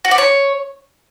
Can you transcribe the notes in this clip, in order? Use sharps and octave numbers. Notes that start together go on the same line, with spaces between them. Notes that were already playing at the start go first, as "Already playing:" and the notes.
F#4
D5
C#5